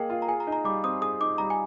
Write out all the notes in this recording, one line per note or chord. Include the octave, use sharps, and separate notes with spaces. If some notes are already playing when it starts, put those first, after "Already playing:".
Already playing: A#3 G#4 D#5 F5 G5
F4
A#5
G#4 G#5
A#5
D#4
A#5
G3 D6
C4 D#6
G#4 D#6
D#4 D6
G3 A#5
G#5